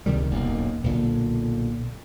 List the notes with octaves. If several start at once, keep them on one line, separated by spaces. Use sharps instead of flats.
C#2 C3 D#3 G3
D#1 B1 F#2 A#3
B1 A#2 D3